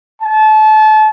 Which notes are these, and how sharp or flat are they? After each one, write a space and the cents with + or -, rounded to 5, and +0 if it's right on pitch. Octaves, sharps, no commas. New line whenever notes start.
A5 -30